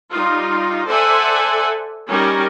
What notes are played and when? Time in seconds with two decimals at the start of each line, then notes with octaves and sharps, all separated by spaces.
0.10 G3 D#4 F4
0.86 A4 C5 D5 E5 F#5 G#5
2.08 G3 C#4 D#4 G4 A#4